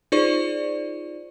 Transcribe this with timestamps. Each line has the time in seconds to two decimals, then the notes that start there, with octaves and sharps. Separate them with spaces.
0.12 D#4 F4 G#4 C5 D5 C#6